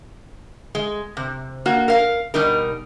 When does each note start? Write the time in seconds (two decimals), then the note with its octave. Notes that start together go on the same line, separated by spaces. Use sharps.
0.75 G#3
1.17 C3
1.66 A#3 F#4
1.88 A#4 F5
2.34 B2 G3 D#4 A#4